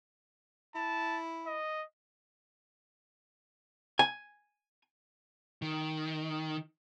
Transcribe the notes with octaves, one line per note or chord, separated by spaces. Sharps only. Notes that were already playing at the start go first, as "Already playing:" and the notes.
E4 A5
D#5
G#5
D#3